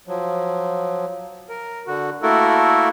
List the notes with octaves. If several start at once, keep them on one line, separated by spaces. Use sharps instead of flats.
F3 F#3
A#4
D3 F#4
A3 A#3 E4 F#4 A4 A#4